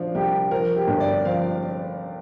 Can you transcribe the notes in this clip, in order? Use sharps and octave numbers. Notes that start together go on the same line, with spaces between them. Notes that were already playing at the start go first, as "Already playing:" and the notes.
Already playing: F3 D4 F5
C2 G4
F3 A#4
G4
G1
D5
F3 F5